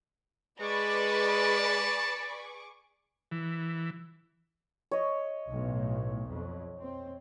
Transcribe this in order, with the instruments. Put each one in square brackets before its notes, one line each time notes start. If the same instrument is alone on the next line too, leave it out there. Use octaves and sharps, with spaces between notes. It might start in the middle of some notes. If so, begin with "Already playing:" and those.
[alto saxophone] G#3 [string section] G#4 C#6 D6 [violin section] B4 D5 B5 [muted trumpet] A5
[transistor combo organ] E3
[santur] C#5 D#5
[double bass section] B1 A2
F2
C4